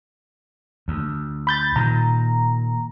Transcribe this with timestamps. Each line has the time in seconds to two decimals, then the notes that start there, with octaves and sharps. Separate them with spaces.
0.88 D2
1.47 B5 G6 A6
1.76 A#2 D#3 A#5